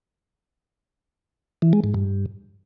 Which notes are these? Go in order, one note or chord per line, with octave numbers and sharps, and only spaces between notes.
E3
G#3
G#2
G2